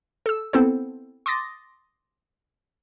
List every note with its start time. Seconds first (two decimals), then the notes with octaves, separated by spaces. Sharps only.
0.26 A4 E6
0.53 B3 C4 E4 A4 C5
1.26 C6 D6 D#6 A6 A#6